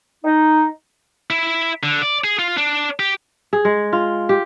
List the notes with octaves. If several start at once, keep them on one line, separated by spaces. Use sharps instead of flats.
D#4
E4
D3
D5
G#4
F4
D4
G4
G#4
G#3
F4
G4